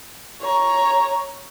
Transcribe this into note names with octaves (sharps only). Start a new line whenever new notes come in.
C#5 A#5